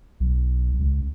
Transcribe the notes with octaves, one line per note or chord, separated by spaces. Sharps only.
B1
C#2